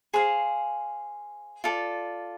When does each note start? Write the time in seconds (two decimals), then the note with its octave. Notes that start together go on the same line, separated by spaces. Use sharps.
0.14 G#4 C5 F5
1.64 F4 A4 D5